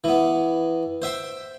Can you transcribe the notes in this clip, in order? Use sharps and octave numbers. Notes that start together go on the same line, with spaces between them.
E3 B3
C5 E5 G5 C6